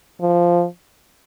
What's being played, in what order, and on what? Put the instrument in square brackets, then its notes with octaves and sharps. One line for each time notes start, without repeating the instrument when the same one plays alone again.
[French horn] F3